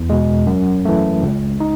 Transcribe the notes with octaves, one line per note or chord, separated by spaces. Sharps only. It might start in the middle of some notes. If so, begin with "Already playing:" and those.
Already playing: E2
B2 G#3
F#2
E3 A3
C#2
D#4